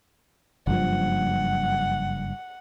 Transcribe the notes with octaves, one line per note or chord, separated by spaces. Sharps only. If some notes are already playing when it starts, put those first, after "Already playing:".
F#1 G2 F3 F#5